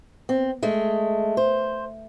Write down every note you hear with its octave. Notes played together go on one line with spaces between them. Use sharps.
C4
G#3 A3
C5